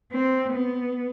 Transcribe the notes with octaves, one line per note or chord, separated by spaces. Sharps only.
C4
B3